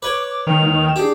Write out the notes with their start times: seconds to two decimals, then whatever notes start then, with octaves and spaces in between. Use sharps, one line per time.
0.03 B4 C#5 D6
0.30 D6
0.47 D#3 G5 F7
0.62 D#2
0.84 G5 E7
0.96 D4 G4 G#4